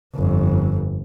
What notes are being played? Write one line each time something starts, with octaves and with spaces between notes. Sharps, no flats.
G1 F2